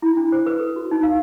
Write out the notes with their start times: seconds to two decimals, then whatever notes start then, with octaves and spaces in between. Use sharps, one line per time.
0.02 E4
0.17 D4
0.32 C5
0.46 B4
0.59 A4
0.76 F#4
0.91 D#4
1.03 F5